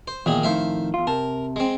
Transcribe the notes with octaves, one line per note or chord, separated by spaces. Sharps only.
C5
E2 A#2 D#3 G#4
F2 A2 D#3 C5 E5 F5
E2 F4
C3 A#4 A5
G#3 C4